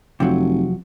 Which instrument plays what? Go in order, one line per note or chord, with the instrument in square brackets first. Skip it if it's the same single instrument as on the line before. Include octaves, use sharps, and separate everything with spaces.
[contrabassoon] F1 [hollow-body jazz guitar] C3 F3 F#3